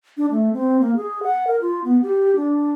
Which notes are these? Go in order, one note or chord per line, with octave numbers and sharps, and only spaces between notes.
D4
A3
C4
A#3
G#4
F#5
A#4
F4
B3
G4
D4